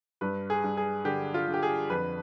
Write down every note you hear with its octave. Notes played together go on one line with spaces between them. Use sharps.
G2 B4
G#4
G2
G#4
D3 G4
F4
D3
G4
G#4
F2 B4